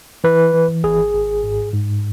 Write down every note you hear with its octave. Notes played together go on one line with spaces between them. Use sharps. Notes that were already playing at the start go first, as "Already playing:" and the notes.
E3 B4
E3
G#1 G#4
G#1
G#2
G#2